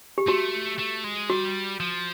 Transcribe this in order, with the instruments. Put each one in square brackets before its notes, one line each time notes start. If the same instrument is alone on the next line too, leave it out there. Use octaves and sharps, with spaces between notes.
[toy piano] G4
[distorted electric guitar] A3 [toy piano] F#4
[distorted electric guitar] A3
G#3
[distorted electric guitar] G3 [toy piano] F#4
[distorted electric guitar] F3